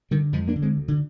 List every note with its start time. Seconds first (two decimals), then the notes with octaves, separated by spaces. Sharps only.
0.11 D3 D#3 G3
0.33 F2 F3 G#3
0.48 A#3 D4
0.55 D3
0.62 G#3 C4
0.77 D2
0.88 D3